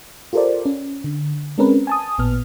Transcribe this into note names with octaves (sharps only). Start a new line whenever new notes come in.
F4 G4 A4 A#4 C5 D5
C#4
D3
G#3 C4 C#4 A#4 B4
G#5 A5 D#6
A1 A#2 B3 F6